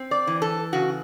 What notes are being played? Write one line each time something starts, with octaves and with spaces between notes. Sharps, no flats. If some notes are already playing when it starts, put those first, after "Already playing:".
Already playing: C4
D5
E3
A4
C#3 F#4